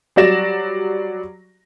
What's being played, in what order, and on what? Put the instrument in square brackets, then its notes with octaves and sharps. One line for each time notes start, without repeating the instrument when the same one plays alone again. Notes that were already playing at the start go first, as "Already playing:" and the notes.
[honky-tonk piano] F#3 G3 F#4 D5 A#6 E7